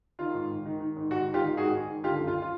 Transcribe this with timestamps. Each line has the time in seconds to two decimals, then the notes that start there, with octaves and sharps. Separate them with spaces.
0.19 D#3 F4
0.34 G#2
0.50 G#2
0.65 D#3
0.80 D#3
0.96 G#2
1.11 G#2 F#4
1.27 D#3
1.34 F4 G4
1.42 D#3
1.57 G#2 F#4 G#4
1.72 G#2
1.88 D#3
2.04 D3 F4 G4
2.20 F#2
2.27 F4
2.42 F4